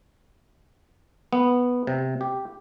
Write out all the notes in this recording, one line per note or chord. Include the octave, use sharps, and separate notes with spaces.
B3
C3
G4